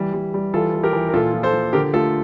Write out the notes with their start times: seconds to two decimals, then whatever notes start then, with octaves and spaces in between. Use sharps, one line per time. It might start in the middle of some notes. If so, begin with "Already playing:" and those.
Already playing: E3 G3
0.14 G3
0.34 G3
0.54 E3 F4 A4
0.74 E3
0.83 G4 A#4
0.93 E3
1.09 A#4
1.14 A#2 F4 A4
1.34 F3
1.43 A4 C5
1.53 F3
1.73 D3 G4 A#4
1.93 A3 F4 A4